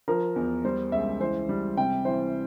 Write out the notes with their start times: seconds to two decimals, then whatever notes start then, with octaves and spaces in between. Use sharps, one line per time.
0.08 F3 A#4
0.36 E2
0.64 G3 C5
0.92 C#2 E5
1.20 E3 C5
1.49 G3
1.77 C3 G5
2.05 E3 C5